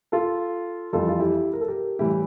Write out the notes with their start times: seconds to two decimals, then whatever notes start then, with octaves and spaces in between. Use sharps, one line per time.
0.12 F4 A4
0.93 F2 E3 G3 F4 A4
1.09 F4
1.19 E4 G4
1.53 A#4
1.61 A4
1.68 G4 A#4
1.99 A2 E3 G3 E4 G4
2.09 E4